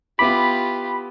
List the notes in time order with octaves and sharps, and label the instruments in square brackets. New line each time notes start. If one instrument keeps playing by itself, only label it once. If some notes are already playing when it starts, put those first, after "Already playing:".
[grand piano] B3 E4 D6 [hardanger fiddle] F4 G4 [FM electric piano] B5